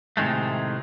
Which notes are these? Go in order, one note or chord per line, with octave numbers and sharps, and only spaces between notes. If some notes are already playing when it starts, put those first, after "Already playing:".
A2 C3 D#3 G#3 A3